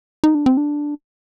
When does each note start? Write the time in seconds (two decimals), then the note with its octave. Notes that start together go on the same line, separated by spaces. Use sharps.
0.24 D#4
0.35 D4
0.46 C4
0.57 D4